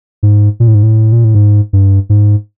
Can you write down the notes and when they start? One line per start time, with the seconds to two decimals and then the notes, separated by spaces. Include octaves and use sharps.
0.23 G#2
0.60 A#2
0.68 A2
0.75 G#2
0.83 A2
1.12 A#2
1.24 A2
1.35 G#2
1.73 G2
2.10 G#2